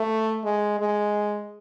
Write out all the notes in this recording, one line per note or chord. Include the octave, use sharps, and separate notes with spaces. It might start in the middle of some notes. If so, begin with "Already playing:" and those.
Already playing: A3
G#3
G#3